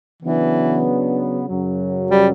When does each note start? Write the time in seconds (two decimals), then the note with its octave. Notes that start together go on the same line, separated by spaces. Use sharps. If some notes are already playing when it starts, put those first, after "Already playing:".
0.23 C#3 E3 F#3 B3 D4
1.49 F#2 C#3 F#3
2.11 G3